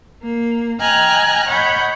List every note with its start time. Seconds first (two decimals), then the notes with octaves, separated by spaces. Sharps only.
0.23 A#3
0.80 D#5 G5 G#5 A#5 F6 F#6
1.47 C#5 D#5 F#5 B5 G6